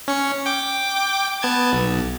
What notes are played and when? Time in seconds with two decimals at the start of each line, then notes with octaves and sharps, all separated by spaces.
0.08 C#4 C#7
0.46 G5 D6
1.42 B3 A5 G#6
1.73 B1